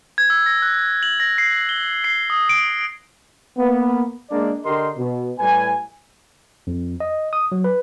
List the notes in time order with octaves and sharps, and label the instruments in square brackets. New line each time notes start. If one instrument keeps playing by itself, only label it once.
[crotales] G#6
E6
A#6
F#6
F#7
A#6
C7
G7
C7
D#6
D7
[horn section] A#3 B3
G#3 A#3 D4 D5
D3 G4 A#4 D#5 C6
B2
A2 G3 B4 G#5
[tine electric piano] F2
D#5
D#6
F#3
B4